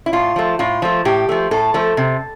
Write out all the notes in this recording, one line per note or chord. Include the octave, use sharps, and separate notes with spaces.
E4
A2 F4
F3 A3
A2 F4
F3 A3
A2 G4
F3 A3
A2 A4
F3 A3
C3